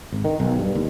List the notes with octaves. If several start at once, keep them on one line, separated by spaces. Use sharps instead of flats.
G#1
D#3
B1
G2
D#2